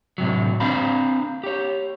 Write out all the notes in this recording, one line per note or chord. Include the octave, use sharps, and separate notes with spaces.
A2 C3 F#3
C4 D4 F5 A#5 B5
G4 C#5